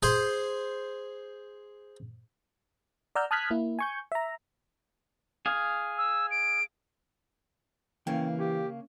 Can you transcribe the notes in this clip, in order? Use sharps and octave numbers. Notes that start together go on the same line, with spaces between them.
G#4 C5
D5 F#5 A#5 E6 F6 G6
A5 D#6 F6 F#6 G#6 B6
A#3 E4
G#5 C#6 G6
E5 A#5
G#4 F5
E6
D7
C#3 E3 A#3 C#4 G5
C#4 G4